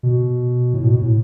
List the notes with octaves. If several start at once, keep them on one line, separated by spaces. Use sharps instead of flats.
B2
A2
B2
A2